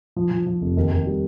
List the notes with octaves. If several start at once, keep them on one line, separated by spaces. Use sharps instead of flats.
F3
F3
F3
F1
D#2
D#2
G3